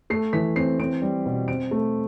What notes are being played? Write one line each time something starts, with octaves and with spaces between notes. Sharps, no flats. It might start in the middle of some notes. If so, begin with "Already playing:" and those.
A3 C7
E3 B6
C4 C7
C4 D7
G3
B2
C4 D7
A3